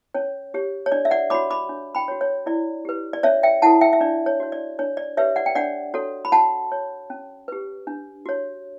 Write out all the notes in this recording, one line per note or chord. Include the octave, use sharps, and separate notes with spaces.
C#4 C#5
G4 C#5
C#5
D4 D5
E5
D5 F#5
F#4 C#5 B5 D6
B5 D6
D4
G5 B5
F#4 C#5
C#5
E4 D5
G4 B4
D5
C#4 C#5 E5
E5 G5
E4 A4 F#5 A5
E5 G5
E5
D4 D5
C#5
F#4 C#5
D5
D4 C#5
D5
G4 B4 C#5 E5
D5 F#5
G5
D4 D5 F#5
F#4 A4 C#5
B5
F#4 F#5 A5
C#5
C#4
G4 B4
D4
F#4 C#5